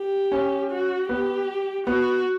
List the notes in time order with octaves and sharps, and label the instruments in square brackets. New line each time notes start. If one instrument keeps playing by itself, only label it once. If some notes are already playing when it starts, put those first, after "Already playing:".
Already playing: [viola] G4
[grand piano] C#4
[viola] F#4
[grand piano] B3 [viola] G4
[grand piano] B3 [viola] F#4